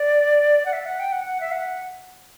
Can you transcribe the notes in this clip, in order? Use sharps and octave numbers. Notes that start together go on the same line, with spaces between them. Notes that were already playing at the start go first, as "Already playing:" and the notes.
Already playing: D5
F#5
E5
F#5
G5
F#5
F#5
E5
F#5